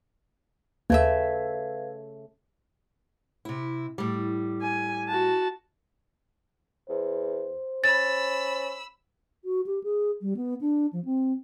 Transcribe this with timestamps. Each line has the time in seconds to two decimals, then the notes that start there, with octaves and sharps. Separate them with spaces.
0.90 D#2 C#3 A3 B4 E5 F5 G#6
3.45 C3 E4
3.98 A2 G3
4.62 G#5
5.09 F#4 A5
6.90 E2 C5
7.84 C#4 B5 E6 A6
9.45 F#4
9.66 G4
9.84 G#4
10.22 G3
10.37 B3
10.61 D4
10.93 F3
11.05 C4